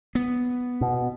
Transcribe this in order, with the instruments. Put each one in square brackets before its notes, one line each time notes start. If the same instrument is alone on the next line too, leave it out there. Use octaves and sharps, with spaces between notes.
[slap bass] B3
[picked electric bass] B2